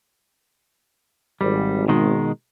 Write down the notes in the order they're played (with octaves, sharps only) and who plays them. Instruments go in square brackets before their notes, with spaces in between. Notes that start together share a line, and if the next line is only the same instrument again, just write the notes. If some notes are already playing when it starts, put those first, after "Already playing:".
[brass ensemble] G#1 [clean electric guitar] G3
[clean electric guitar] B2 D#3 G#3